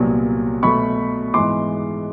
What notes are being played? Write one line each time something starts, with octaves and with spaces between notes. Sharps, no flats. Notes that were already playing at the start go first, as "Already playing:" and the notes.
Already playing: C2 A#2 F#3 B3
B2 F#3 A3 B5 C#6
G#2 E3 G#3 B3 C6 D6